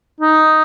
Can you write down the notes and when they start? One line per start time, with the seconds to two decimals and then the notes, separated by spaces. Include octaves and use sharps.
0.20 D#4